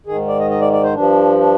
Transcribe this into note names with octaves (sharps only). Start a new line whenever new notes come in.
G#2 D#3 G#4
D5
D#5
D#5
D5
D5
C5
G2 F3 D4
D4